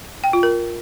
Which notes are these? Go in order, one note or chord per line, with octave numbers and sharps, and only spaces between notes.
G5
F4
A#4